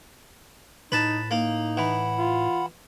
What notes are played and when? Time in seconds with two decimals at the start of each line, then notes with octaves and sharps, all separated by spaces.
0.92 A2 D#4 B4 A5
1.31 A#3 D#4
1.77 E3 F#5 B5
2.19 F4